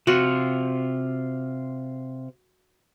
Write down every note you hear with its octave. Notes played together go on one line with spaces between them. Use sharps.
C3 F4 F#4